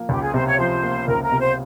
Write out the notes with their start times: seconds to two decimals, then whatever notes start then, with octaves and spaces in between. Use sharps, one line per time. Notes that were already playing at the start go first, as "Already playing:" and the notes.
Already playing: F3 A#3
0.09 C#2 G4
0.21 G#4
0.34 C3 C5
0.46 C#5
0.58 F3 C5
0.83 A#3
1.08 C#2 A#4
1.23 A#4
1.32 C3
1.40 C5